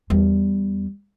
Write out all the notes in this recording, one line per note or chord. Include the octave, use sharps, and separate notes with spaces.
E2 G3